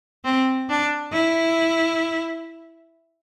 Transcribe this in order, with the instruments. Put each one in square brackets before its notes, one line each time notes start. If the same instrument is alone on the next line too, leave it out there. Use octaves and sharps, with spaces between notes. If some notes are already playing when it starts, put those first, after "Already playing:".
[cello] C4
D4
E4